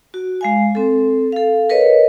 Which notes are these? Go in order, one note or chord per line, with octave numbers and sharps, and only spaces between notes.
F#4
G#3 F5 G#5
C4 A4
A4 F5
A#4 B4 C#5 D#5